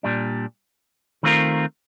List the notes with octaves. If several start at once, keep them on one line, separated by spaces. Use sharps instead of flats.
A#2 G3 D4
D#3 A3 C4 F4 A#4